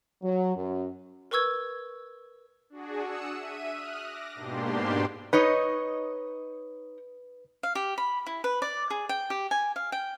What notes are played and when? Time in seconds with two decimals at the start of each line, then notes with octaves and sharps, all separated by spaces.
0.22 F#3
0.55 F#2
1.31 A#4 B4 C#6 E6 G#6
2.70 D4 F#4 G#4
3.02 D#6 E6 F#6 C#7 E7
3.32 E5 D#7
3.70 D#6 F6 F#6
4.00 D6 A#6
4.34 G#2 B2 A#3 D4 G4 C6
5.33 D#4 B4 C#5 D#5
7.63 F5
7.75 G4
7.98 B5
8.27 E4
8.44 B4
8.62 D5
8.90 G#4
9.09 G5
9.30 G4
9.51 G#5
9.76 F5
9.92 G5